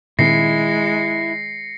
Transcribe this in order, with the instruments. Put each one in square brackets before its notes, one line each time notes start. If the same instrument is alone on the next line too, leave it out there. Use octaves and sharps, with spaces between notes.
[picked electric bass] A#2 D#3 C4 [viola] G#3 [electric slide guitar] E4 [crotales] A#6 C7 C#7